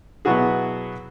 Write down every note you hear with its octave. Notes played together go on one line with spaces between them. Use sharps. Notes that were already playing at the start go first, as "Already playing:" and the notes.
B2 F#3 B3 E4 F#4 G#4